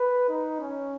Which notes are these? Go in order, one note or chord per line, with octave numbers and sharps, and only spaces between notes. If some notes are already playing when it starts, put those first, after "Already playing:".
Already playing: B4
D#4
C#4